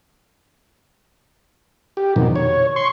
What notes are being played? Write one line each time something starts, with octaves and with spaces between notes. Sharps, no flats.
G4
F2 B2 D#3
C#5
C6 C#6